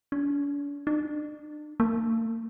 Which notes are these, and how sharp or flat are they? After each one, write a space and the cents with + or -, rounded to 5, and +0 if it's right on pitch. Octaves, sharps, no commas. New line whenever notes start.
D4 -45
D4 +40
A#3 -40